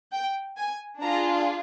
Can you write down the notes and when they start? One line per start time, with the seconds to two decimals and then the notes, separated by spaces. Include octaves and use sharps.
0.13 G5
0.57 G#5
1.01 D4 F4 G#4 A#5